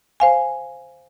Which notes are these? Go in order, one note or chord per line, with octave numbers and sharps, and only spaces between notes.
C5 F5 G#5